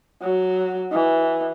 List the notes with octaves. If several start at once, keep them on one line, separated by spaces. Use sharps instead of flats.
F#3
E3